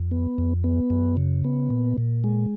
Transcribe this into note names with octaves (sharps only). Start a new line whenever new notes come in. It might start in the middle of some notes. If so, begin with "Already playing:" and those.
Already playing: F2
B3
F2
B3
F#2
C#3
B3
A#2
A#2
G#3